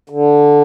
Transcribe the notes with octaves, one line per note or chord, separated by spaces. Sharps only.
D3